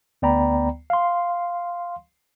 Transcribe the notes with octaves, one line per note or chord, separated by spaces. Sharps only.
D2 B3 D5 G5 A#5 B5
F5 C6